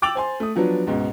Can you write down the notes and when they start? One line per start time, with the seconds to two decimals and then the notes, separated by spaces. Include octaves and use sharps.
0.02 G5 D6 E6 A6 F7 F#7
0.15 C5 G#5 C6
0.40 A3 D#6
0.55 F3 F#3 B3 D4
0.87 C#2 G#2 B2